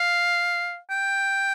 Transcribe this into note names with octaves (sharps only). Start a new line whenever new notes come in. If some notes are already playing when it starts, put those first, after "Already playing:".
Already playing: F5
G5